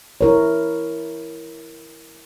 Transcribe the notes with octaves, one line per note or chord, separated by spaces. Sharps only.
E4 A#4 C#5